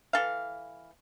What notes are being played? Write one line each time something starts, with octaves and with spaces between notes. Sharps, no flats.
E3 A4 F5